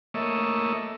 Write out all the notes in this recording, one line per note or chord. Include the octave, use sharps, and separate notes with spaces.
A3 A#3 C#5 D#5 E5